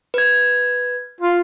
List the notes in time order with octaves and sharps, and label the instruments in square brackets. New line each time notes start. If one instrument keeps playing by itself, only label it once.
[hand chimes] B4 G#6
[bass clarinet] F4